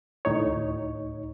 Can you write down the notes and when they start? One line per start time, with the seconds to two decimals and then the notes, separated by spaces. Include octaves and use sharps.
0.25 D2 A2 D#4 C#5